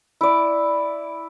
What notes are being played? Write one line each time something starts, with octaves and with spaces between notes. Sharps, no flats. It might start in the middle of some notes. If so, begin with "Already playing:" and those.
E4 D5